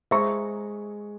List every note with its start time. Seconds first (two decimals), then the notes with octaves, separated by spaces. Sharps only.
0.11 G#3 C5 E5 A#5 C#6